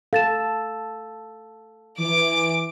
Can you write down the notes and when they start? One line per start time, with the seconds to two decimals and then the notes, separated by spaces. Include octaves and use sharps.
0.13 A4 F5 A6 E7
1.98 E3 D6 D7